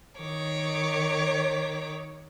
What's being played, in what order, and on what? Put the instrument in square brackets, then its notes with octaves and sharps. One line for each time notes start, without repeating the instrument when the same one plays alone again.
[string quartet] D#3 C#5 D6